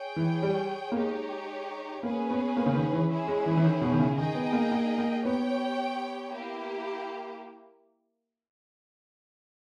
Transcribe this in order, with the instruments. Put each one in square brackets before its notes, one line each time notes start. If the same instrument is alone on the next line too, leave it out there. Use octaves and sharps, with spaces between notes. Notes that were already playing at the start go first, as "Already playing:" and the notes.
Already playing: [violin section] G#4 C#5 G5
[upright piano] E3
G3
A#3
[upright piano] G#3 [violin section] D#4 G4 C#5
[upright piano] A#3 [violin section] C#4 G#4 B4
[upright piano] B3
A#3
C#3
D#3
E3
[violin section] C#4 E4 G#4
[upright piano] G#3
E3
E3
D#3
B2
D#3
C#3
[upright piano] D#3 [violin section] D#4 G#4 D#5 G5
[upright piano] B3
A#3
A#3
A#3
[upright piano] B3 [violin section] G4 C#5 G5
[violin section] A#3 E4 G4